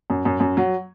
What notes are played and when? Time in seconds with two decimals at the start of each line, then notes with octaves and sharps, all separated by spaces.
0.10 F#2
0.25 F#2
0.40 F#2
0.57 F#3